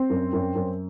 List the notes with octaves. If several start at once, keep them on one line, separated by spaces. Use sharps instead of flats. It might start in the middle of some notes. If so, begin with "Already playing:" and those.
Already playing: C4
F#2
F#2
F#2